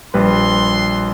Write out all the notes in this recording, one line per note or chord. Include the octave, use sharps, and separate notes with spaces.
A#1 G3 B4 C6